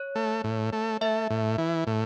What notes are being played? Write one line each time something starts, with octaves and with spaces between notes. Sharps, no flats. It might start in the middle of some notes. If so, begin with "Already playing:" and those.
Already playing: C#5
A3
A2
A3
A3 E5
A2
E3
A2